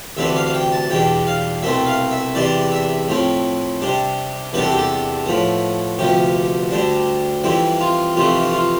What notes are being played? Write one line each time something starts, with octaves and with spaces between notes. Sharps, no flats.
D2 C3 E3 B3 D4 E5
F5
F5
G5
A5
E2 B2 G3 D4 G5
F5
C2 B2 A3 C4 E5
F5
E5
E2 C3 E3 G3 D4 D5
E5
A2 F3 C4
C3 G3 D4
E2 C3 G3 B3 D4 B4
A4
G4
A4
A2 F3 B3
D2 C3 F3 B3 G4
D2 D3 G3 D4
F2 E3 G3 C4 E4
F4
F2 C3 E3 A3 F4
E4
F4